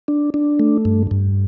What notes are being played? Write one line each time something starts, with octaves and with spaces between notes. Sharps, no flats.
D4
D4
A3
G2
G2